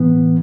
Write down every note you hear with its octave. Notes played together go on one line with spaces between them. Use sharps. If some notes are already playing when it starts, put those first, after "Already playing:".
Already playing: A2 E3 B3